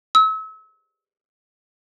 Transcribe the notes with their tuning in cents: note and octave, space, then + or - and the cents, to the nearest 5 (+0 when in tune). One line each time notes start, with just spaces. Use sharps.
E6 -35